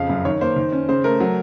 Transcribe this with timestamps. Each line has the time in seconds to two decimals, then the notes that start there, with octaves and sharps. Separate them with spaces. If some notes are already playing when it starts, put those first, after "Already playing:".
Already playing: F2 C#3 F5
0.09 F#2
0.25 D#3 C#5
0.41 A#3 C5
0.56 D#3
0.72 C#4
0.89 C#3 C5
1.04 A3 A#4
1.20 F#3